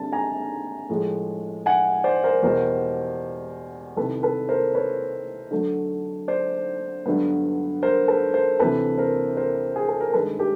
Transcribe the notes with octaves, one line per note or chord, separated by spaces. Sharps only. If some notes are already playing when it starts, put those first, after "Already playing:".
Already playing: G2 D3 G3 C4 A5
G#5 A#5
A2 F3 G#3
F#5 G#5
C5 D5
A#4 C5
E2 B2 G3 B3 A#4 C5
C2 C3 D#3 A4 B4
A4 B4
A#4 C5
B4 C#5
D3 F#3 A3
C5 D5
G2 D3 F#3 B3
A#4 C5
A4 B4
A#4 C5
D2 C3 E3 A4 B4
A#4 C5
A#4 C5
G#4
A4
A#4
G2 D#3 G#3 A4 B4
G4 A4